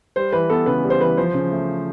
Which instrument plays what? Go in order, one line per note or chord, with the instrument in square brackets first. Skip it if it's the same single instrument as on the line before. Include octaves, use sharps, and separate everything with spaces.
[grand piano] G3 [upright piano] C5
[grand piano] E3 [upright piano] B4
[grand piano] B3 [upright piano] A4
[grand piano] C#3 [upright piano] B4
[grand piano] G3
[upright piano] C5
[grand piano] E3 [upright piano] B4
[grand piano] F3 [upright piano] C5
[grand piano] C#3
A3